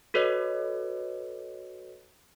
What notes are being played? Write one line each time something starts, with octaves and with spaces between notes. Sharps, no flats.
F#4 A4 B4 C#5 D#5